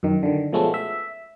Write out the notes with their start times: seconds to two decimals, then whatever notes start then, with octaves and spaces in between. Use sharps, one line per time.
0.03 F#2 D#3
0.23 D3 D#3
0.53 B2 F3 G#3 A3 B3 C#4
0.74 E5